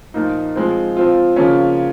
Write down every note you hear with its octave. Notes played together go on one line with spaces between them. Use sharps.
A#2 F3 A#3 D#4
F3 G#3 C4
F3 C4 F4
C#3 F3 A#3 C#4